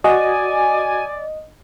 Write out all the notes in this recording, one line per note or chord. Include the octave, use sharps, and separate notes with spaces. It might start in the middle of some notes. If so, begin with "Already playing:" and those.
F#4 D5 D#5 G#5